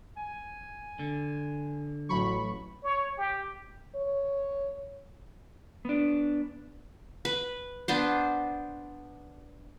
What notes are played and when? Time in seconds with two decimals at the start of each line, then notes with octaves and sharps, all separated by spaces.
0.17 G#5
0.99 D3
2.09 A1 F#3 B5 C#6
2.83 C#5
3.18 G4
3.95 C#5
5.85 B3 D4
7.25 B4
7.88 B3 D4 C5